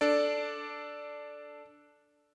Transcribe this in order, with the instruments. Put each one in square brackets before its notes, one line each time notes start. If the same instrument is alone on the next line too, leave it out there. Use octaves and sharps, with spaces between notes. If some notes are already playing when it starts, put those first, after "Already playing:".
[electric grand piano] D4 A4 D5